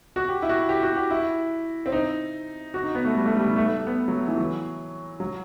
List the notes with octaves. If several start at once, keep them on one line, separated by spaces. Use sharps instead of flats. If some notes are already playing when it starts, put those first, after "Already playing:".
F#4
G4
E4
F#4
G4
F#4
G4
E4
C4
D#4
F#4
D#4
B3
A3
G3
A3
G3
D#3
A3
A3
B3
F#3
E3
F#3
F#3